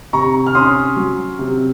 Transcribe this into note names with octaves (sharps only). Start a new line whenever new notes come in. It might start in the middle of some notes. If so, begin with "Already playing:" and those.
C3 A#5 C#6
F6
C#4 C6 D#6
F#3
C3